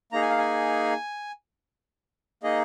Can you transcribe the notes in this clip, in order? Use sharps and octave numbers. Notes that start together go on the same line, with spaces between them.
A#3 D#4 G#4 A#5
G#5
F5
G#5
A#3 D#4 G#4 D#5